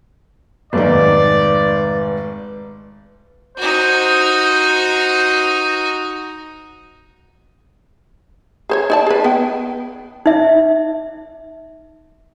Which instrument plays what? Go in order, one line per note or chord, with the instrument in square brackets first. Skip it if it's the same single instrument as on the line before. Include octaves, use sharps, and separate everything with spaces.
[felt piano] F1 G#2 D#3 [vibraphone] B4 [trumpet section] D5
[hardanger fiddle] D#4 F#4 [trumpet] C5
[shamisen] G#4 C5 C#5
D#4 D5 A5
G#4 B4
B3 G5
[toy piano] D#4 E5